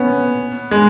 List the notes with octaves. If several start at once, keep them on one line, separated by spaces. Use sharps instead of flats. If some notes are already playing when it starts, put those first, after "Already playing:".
Already playing: B3 C#4
G#3